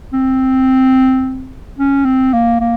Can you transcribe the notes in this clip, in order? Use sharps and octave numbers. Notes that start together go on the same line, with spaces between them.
C4
C#4
C4
A#3
A#3